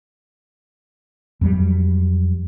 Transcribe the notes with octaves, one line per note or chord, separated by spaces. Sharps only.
F2 F#3 G3